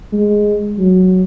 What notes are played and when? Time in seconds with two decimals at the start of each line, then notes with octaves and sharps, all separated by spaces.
0.13 G#3
0.78 F#3